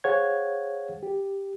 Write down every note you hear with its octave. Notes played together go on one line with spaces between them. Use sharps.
G#4 C5 C#5 F5 F#5 G#6
G4